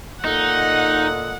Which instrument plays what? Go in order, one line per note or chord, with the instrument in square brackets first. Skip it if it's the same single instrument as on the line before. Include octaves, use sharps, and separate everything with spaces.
[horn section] A#2 A4 D#5 [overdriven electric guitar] D#4 [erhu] F#5